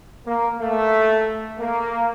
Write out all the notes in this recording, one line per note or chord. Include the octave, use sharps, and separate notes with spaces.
A#3
A3
A#3